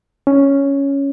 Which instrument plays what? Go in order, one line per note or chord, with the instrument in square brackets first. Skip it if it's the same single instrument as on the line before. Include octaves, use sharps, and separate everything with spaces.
[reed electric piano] C#4